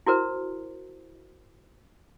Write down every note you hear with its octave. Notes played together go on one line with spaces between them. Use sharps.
E4 F#4 A#4 C5